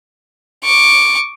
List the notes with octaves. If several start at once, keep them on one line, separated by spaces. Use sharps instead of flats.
C#6 D6